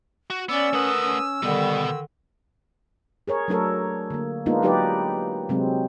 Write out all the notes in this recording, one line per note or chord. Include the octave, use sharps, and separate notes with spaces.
F#4
B3 C#4 D5 E6
A3 A#4 B4 F#5 D#6
C#4
B2 D3 D#3 G3 B3
G#4 A#4 C#5
F#3 A3 D4 A4 A#4 C#5
D3 A#3
G#3 A#3 B3 D4 D#4 F4
F#3 D#4 G4 B4 D5
C3 F#3 G#3 C4